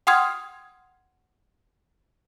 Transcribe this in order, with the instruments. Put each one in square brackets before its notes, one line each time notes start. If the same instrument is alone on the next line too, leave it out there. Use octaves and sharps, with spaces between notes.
[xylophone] F#5 G5 C6 D#6 F6 G#6